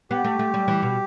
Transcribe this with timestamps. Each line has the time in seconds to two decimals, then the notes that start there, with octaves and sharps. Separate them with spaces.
0.11 B3 G4
0.24 A3
0.39 A3
0.54 G3
0.68 E3
0.82 B2